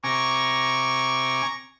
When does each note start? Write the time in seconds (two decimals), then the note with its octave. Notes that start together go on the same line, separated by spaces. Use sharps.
0.04 C3 G#5 A#5 C#6 D6